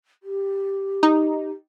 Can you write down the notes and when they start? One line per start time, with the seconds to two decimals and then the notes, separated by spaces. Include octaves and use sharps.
0.23 G4
1.03 D#4